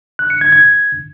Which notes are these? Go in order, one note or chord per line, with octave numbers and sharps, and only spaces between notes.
F#6
C#7
G#6
G#6